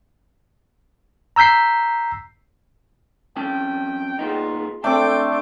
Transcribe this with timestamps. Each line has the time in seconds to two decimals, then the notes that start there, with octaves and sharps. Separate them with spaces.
1.36 A#5 E6 G6 B6 C7
3.36 F2 C#4 G5 A5
4.19 A#2 B3 D#4 F4 G#4
4.84 A3 C4 D4 A4 G5 C6 D6